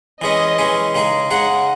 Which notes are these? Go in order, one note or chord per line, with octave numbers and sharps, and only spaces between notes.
E3 G#3 C#4 D#5
E3 G#3 C#4
C#3 G#3 D#4 G#4
C#3 G#3 D#4 G#4 F#5